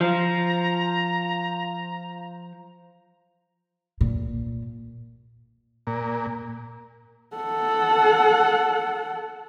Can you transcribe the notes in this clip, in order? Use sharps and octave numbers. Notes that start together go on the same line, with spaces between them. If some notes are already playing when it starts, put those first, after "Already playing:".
F3 A#5
A#2
A#2
A4 F#5